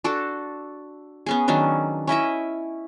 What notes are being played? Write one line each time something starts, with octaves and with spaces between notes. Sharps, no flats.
D4 F#4 A4
B3 C#4 G#4
D#3 F#3 C#4 D4
C#4 E4 D#5 E5